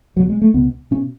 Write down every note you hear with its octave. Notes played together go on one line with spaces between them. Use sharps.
C#2 B2 F#3
G#3
A3
C#2 B2 B3
B2 C#4